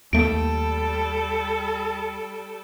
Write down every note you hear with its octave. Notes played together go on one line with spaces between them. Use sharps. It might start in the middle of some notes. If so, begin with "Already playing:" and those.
D#2 G3 A3 A#3 A4 D7